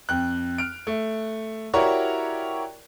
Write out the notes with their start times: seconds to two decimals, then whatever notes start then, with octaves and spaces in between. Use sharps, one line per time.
0.09 F2 G5 F#6
0.58 F6 D7
0.87 A3
1.73 E4 F#4 G4 A#4 C#5 D5